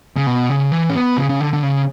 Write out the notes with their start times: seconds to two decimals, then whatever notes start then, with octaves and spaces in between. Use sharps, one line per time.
0.17 C#3
0.27 B2
0.49 C#3
0.72 E3
0.90 C#4
0.95 B3
1.18 C#3
1.29 C#3
1.40 D3
1.53 D3
1.63 C#3